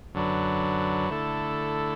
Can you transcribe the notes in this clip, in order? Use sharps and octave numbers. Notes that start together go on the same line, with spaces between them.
F#2 D3 F#3 D4 B4
D3 A3 E4 A4